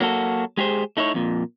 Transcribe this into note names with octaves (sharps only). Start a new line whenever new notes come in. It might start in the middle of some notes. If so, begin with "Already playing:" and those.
F#3 A#3 F#4 A4
G#3 G4 G#4 C5
A3 D#4 E4 C5 C#5
F2 A#2